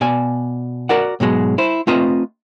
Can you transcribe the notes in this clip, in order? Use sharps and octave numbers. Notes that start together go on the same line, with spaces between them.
B2 D5 G#5
F#4 A#4 D5 F#5
G#2 B2 F#3 G#3
E4 C5
A3 C4 F4 B4 D#5 A#5